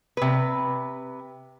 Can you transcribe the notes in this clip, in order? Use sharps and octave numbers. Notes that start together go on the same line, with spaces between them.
C3 B4